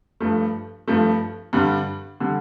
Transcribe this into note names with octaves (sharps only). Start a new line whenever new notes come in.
G2 F3 A3
G2 F3 A3
G2 D3 G3
D3 G3